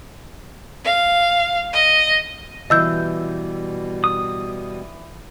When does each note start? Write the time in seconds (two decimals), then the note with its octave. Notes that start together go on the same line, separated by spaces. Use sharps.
0.85 F5
1.73 D#5
2.70 B2 E3 G3 D#5 E6 G6
4.04 D#6